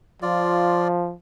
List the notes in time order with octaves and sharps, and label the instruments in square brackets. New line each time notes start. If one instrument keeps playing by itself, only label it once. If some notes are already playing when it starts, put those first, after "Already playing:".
[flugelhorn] F3 [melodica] F4 D5